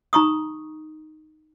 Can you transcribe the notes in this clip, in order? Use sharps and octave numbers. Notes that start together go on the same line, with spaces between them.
D#4 A#5 C#6 D#6